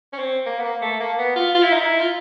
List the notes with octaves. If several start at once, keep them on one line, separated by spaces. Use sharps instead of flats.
C#4
C4
A#3
B3
A#3
A3
A#3
B3
F4
F4
E4
D#4
E4
F4